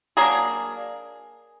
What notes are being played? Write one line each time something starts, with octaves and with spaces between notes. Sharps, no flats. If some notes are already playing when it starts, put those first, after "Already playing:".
F#3 A#3 D4 G#4 A#4